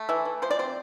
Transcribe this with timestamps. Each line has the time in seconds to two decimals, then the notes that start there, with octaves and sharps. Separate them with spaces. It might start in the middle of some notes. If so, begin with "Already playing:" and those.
Already playing: A3
0.09 E3 E5
0.25 E3
0.42 F3 C5
0.51 D5
0.59 C4 C5